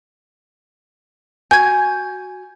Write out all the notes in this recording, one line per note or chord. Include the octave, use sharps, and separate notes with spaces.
F#4 G#5 G6 G#6